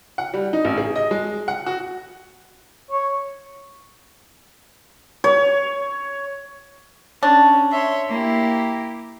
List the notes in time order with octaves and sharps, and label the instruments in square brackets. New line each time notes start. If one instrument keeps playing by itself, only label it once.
[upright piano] F#5
G3
D#4
A1
G#4
D#5
G#3
F#5
F#4
[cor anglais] C#5
[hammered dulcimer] C#5
[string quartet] C#4 [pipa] D4
[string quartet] C#5 E5 C6
A#3 E4 G4